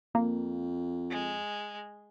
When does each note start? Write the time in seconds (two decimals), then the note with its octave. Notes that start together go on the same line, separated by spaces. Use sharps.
0.15 F2 A#3
1.11 G#3